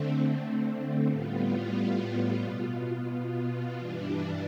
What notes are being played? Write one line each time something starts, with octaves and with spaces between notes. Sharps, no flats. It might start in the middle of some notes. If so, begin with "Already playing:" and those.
Already playing: D3 A3 C4
A2 G3 B3 F4
B2 B3 F4
G2 E3 G3 D4